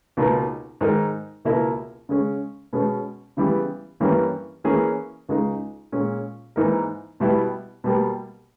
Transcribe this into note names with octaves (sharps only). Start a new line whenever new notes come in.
C#2 B2 A#3 D#4
G#2 D#3 G#3 D#4 A#4
C#2 B2 A#3 E4 A#4
C#3 G#3 C#4
B2 G#3 C#4
C#3 E3 G3 B3
G2 E3 G3 A#3 C#4
E3 A#3 C#4 G#4
C#2 C#3 G#3 D#4
A#2 G#3 C#4
G#2 E3 A#3 D#4 A#4
B2 G3 B3 E4
B2 G3 A#3